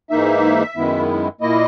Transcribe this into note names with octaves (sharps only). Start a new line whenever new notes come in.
G#2 E3 A#3 D#4 E5
F#2 D#3 G#3 B3 E4
A#2 A#3 E4 D#5